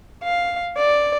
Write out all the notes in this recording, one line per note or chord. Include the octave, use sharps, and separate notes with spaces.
F5
D5